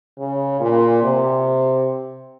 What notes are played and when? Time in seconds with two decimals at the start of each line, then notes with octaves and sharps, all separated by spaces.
0.18 C#3
0.60 A#2
1.03 C3